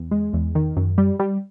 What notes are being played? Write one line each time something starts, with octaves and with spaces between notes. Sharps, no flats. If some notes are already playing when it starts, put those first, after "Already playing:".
Already playing: E2
G#3
E2
D#3
F#2
G3
G3